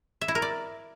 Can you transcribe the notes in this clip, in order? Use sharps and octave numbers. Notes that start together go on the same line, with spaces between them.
E5
E4
A#4
D5